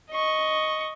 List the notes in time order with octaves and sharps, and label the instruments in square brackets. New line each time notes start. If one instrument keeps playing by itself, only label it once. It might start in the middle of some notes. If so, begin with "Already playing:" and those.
[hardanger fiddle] D#5 C#6